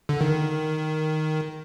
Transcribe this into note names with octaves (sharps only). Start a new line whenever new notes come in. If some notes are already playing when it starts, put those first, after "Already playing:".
D3
D#3